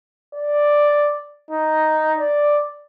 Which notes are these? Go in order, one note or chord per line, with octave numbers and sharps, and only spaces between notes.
D5
D#4
D5